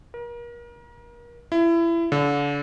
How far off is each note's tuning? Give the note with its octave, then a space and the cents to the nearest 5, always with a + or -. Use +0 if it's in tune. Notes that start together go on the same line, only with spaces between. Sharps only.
A#4 +35
E4 +25
D3 -35